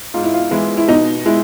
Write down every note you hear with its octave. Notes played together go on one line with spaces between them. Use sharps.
G#2 F4
E4
F4
E3 G#3 E4
E4
B2 D#4
G#3 E4